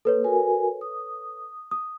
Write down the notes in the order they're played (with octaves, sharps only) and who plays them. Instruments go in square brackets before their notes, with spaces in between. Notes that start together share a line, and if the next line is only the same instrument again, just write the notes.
[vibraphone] A#3 [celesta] A4 B4 C#5
[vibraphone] F#4 A#4 G#5
D#6
[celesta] D#6